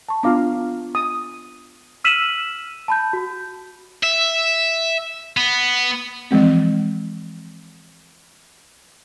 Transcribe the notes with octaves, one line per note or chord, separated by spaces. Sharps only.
A5 C#6
B3 D4 F4 F5 A#5 D6
D#6
E6 F6 B6 D#7 E7 F#7
A5 B5 G6
F#4
E5
B3
E3 F3 G#3 C4